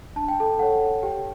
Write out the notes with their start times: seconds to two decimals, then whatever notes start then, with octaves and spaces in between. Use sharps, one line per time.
0.16 D4 A5
0.28 G5
0.40 A4 A5
0.59 A4 C#5 F#5
1.03 G4 G5